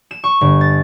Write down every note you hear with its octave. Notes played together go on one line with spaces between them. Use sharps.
E7
C#6
G1
A6